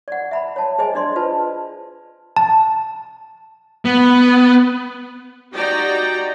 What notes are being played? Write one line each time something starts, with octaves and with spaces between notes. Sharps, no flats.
D5 F#5
E5 A#5 B5
C#5 A5
G#4 C5 D#5 G#5
D4 D5 D#5 C6
F4 B4 C5 A5
A5
B3
D#4 F#4 G4 D5 G5 A#5